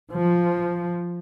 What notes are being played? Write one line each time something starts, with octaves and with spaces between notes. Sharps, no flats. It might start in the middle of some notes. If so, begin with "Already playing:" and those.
F3